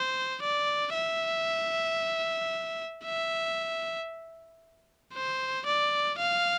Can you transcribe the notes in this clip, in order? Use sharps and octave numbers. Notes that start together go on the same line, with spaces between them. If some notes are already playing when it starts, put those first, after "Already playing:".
Already playing: C5
D5
E5
E5
C5
D5
F5